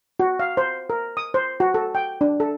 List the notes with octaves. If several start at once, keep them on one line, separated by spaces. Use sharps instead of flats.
F#4
F5
C5
A#4
D#6
C5
F#4
A4
G5
D4
A4